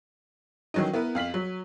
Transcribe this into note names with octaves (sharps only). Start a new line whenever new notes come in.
D#3 E3 F#3 C#4 D#4
B3 E4 A#4 B4
F2 F5 B6 F#7
F#3